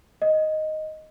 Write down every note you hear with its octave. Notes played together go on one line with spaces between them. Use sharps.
D#5